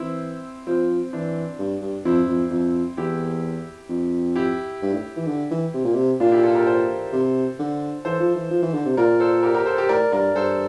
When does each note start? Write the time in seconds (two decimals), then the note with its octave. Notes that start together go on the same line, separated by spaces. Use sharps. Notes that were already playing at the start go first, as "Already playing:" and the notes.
Already playing: E3 C4 E4
0.67 F3 C4
1.13 E3 D4
1.59 G2
1.82 G2
2.05 F2 C4 E4
2.28 F2
2.51 F2
2.97 E2 E4 G4
3.90 F2
4.36 E4 G4
4.82 G2
4.93 A2
5.17 E3
5.28 D3
5.51 E3
5.74 C3
5.85 A#2
5.95 C3
6.20 A#2 D4 F4
6.32 E4 G4
6.43 F4 A4
6.55 G4 A#4
6.67 A4 C5
7.13 C3
7.59 D3
8.05 E3 A4 C5
8.20 F3
8.36 E3
8.51 F3
8.63 E3
8.74 D3
8.85 C3
8.97 A#2 A#4 D5
9.20 A4 C5
9.43 G4 A#4
9.54 G4 A#4
9.66 A4 C5
9.78 G4 A#4
9.89 A2 A#4 D5
10.12 G2 A#4 D5
10.36 G2 A4 C5